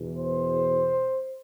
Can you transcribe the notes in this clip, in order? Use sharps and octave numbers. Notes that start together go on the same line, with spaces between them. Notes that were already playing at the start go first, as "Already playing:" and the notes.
Already playing: E2 B2
C5